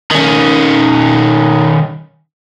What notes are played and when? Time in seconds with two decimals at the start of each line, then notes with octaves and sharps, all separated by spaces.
0.11 D#3 C#4